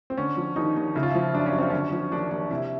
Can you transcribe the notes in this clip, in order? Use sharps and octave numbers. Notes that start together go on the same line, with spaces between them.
C4
D3 C#4
F3
D#2 D#4
D#2
C#3 E4
F4
F3 E4
F#2 D4
C#4
F#2
C4
D3 C#4
F3
D#2 D4
D#2
C3 E4